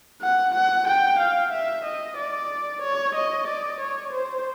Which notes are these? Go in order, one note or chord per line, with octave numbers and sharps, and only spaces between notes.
F#5
F#5
G5
F5
E5
D#5
D5
C#5
D#5
D5
C#5
C5